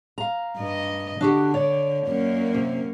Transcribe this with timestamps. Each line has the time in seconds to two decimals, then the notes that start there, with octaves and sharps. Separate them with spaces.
0.18 F5 A#5
0.57 G2 D#5
1.21 D3 D4 F#4 G4
1.54 C#5 D5
2.07 F#2 A#3 C#4
2.54 C3